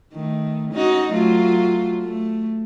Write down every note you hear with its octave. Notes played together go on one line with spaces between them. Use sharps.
D#3 A3
C#4 D#4 F#4
F#3 A3 F4
A3